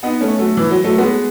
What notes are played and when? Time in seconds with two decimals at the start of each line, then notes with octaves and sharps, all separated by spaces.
0.03 B3 D#4
0.21 A3 C#4
0.39 F#3 A3
0.57 E3
0.71 F#3
0.84 F#3 A3
0.98 G#3 B3